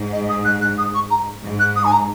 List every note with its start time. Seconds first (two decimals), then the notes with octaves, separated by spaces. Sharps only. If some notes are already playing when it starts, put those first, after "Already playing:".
Already playing: G#2
0.12 D#5
0.29 D#6
0.44 F#6
0.61 F#6
0.78 D#6
0.94 C#6
1.10 A#5
1.43 G#2
1.59 F#6
1.75 D#6
1.84 G#5
1.92 A#5